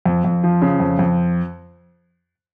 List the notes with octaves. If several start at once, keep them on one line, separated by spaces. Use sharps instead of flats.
F2
F2
F3
C#3
F2
F2